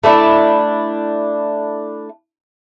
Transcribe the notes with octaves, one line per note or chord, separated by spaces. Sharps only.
A3 D4 E4